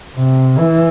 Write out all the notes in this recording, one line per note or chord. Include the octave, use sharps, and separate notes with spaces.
C3
E3